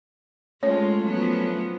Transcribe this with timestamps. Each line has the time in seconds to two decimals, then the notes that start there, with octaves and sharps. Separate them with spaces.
0.63 G#3 A3 C#4 F4 C#5
1.04 F3 F#3 B3